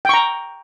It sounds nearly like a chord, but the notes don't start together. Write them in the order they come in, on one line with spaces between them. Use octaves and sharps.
G5 C#6 A#5